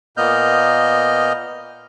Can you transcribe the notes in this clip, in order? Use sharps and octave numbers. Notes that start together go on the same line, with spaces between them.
A#2 A#3 B3 D#5 F6 G6